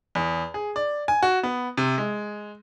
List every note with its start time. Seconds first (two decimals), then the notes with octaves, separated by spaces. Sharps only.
0.15 E2
0.54 G#4
0.76 D5
1.08 G#5
1.23 F#4
1.43 B3
1.77 C3
1.98 G#3